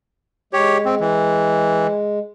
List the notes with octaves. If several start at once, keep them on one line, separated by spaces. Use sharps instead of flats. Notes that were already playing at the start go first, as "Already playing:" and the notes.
G#3 G4 C#5
C4
E3